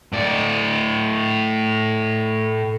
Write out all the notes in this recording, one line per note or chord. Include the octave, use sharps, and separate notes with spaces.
A2 D5